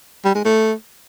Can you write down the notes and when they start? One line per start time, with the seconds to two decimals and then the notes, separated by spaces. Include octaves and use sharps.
0.25 G3
0.35 G#3
0.45 A3